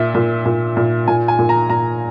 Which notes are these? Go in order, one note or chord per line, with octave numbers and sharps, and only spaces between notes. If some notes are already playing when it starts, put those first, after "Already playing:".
Already playing: A#2 E5
A#2
A#2
A#2
A#2 G#5
G#5
A#2
A#5
A#2 A#5